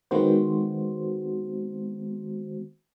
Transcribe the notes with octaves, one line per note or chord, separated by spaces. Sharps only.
D#3 G#3 B3 C4 F#4 C5